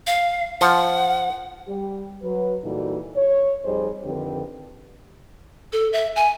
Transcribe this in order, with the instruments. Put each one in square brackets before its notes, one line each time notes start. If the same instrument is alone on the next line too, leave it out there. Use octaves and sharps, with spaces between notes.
[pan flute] F5
[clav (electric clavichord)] F3 [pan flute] F#5
[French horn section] G3 G4
F#3 B4
A#2 E3 G3 D#4 F#4 A4
C#5
F2 G3 D#4 G#4 C5 D#5
F2 D3 D#3 C4 G4 B4
[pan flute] A4
E5
G#5